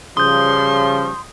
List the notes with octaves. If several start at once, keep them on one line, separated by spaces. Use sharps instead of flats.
C#3 F3 G3 C6 D#6 G6